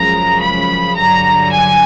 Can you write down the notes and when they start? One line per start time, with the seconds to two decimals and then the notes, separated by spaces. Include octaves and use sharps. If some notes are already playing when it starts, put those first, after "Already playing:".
Already playing: F#2 C#3 F3 G#3 A#5
0.39 B5
0.95 G2 D3 F#3 A#5
1.52 G#5